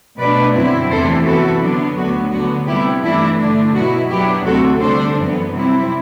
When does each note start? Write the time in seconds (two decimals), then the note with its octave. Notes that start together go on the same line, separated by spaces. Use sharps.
0.18 B2 A3 D4 B4 D5
0.54 F#2 D3 F#3 C4 E4
0.89 E2 C3 E3 A3 E4 A4 C5
1.25 F#2 E3 B3 E4 F#4 A4
1.60 D3 F#3 B3 D4
1.96 D2 D3 F#3 B3 F#4
2.31 D3 F#3 B3 F#4
2.67 C3 G3 B3 D4 E4 G4
3.02 G2 E3 A3 D4 E4
3.39 D3 A3 D4
3.74 B2 F#3 B3 E4 F#4
4.10 F#2 F#3 B3 D4 E4 G4
4.45 D2 C3 G3 C4 F#4 A4
4.80 D3 G3 D4 A4 C5
5.17 F#2 E3 B3
5.52 C3 G3 C4 E4